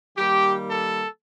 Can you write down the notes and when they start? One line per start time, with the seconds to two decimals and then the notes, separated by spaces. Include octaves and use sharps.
0.17 D#3 G3 A#3 G4
0.70 A4